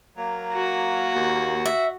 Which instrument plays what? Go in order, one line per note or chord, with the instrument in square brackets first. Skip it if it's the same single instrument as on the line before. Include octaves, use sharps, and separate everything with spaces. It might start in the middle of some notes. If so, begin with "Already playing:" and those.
[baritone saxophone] F#3 [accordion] A#3
[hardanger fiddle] F#4
[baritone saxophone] D#2
[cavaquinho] E5